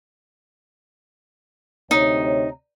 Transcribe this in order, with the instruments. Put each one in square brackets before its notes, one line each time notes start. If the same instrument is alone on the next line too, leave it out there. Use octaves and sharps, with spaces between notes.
[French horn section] D2 C3 C#5 [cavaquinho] D#4